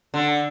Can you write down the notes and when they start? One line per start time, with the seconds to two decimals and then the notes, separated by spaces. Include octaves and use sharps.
0.14 D3